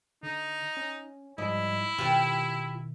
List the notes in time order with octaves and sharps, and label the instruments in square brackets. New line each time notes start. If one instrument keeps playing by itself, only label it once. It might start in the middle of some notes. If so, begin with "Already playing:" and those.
[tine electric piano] D3 [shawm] D#4
[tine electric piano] C#4
[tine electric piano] G#2 F3 G3 [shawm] E4 [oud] D#5
[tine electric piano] B2 D#3 [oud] F4 G4 B4